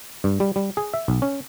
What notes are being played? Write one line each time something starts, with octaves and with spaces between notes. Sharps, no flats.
G2
G3
G3
G#4
E5
B1
C#4